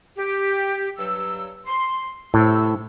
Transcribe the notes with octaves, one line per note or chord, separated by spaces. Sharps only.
G4
G2 F#3 E6
C6
A2 C3 E6